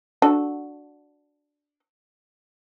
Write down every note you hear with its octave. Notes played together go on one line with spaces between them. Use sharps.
D4 F#4 A4